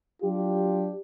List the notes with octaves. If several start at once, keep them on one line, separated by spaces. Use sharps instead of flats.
F#3 D4 F4 G4